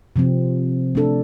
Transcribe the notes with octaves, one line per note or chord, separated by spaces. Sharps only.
C3 F3 C4
A3 D4 A4